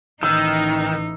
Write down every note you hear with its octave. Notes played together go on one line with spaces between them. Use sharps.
A1 D#3 E3 D#4 E6